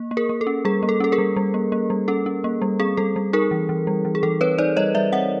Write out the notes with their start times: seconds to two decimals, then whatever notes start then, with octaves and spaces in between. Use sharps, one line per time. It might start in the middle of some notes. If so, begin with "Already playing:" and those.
Already playing: A#3
0.11 A#3
0.17 G#4 A#4
0.29 A#3
0.41 A4
0.47 C#4
0.65 G3 G#4
0.83 A#3
0.89 A4
1.00 C#4 A4
1.12 G#4 A#4
1.18 G3
1.36 G3
1.54 A#3
1.72 A#3
1.90 G3
2.08 C#4 A4
2.26 C#4
2.44 A#3
2.62 G3
2.80 C4 G#4
2.97 G3 A4
3.16 G3
3.33 D#4 G#4 A#4
3.51 E3
3.69 E3
3.87 G3
4.05 E3
4.15 G#4
4.23 E3 A4
4.41 C4 B4 C#5
4.58 D#4 C5 D5
4.77 G3 C#5 D#5
4.95 G3 D5 E5
5.13 C4 E5 F#5